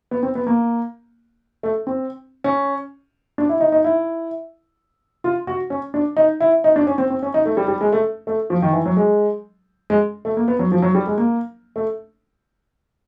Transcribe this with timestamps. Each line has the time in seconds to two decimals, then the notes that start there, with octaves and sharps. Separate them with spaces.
0.11 B3
0.23 C4
0.35 B3
0.47 A#3
1.63 A3
1.87 C4
2.44 C#4
3.38 D4
3.49 E4
3.61 D#4
3.72 D#4
3.84 E4
5.24 F4
5.47 F#4
5.70 C#4
5.94 D4
6.17 D#4
6.40 E4
6.64 D#4
6.76 D4
6.87 C#4
6.98 C4
7.10 C4
7.23 C#4
7.34 D#4
7.46 A3
7.57 G3
7.68 G3
7.81 G#3
7.92 A3
8.27 A3
8.50 F3
8.62 D#3
8.73 E3
8.86 F#3
8.97 G#3
9.90 G#3
10.25 A3
10.37 A#3
10.48 B3
10.59 F#3
10.72 F3
10.82 F#3
10.95 G3
11.07 G#3
11.18 A#3
11.76 A3